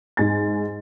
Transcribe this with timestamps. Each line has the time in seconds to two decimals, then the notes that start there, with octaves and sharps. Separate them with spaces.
0.17 G#2 G#5 A6